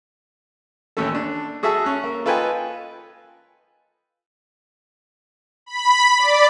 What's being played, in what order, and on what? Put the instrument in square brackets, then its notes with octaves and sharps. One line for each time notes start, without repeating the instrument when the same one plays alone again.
[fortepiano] A1 D#2 A3 C#4 A4
D4
F#4 G#4 A4 E5 A5 E6
C#4 F#6
A#3
F4 A4 B4 D#5 G5 G#5
[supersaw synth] B5
D5